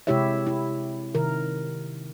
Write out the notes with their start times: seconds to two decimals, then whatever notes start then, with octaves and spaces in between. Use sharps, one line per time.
0.07 C3 G#3 E4 G4 C#5 E5
0.47 E4
1.15 C3 D#3 A#4